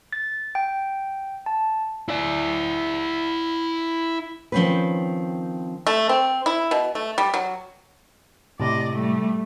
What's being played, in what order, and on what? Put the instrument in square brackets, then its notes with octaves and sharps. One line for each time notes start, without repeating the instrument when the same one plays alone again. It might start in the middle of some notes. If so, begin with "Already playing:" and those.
[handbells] A6
G5
A5
[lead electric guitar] E4 D5
[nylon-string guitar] D#3 F3 G3 C4 C#4 B4
[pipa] A3
C4
E4
B2
A3
G3
F#3
[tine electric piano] A2 C3 [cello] D5 D#5
[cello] G3 A3